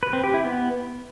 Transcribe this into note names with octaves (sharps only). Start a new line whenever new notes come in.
B4
C4
G4
E4
B3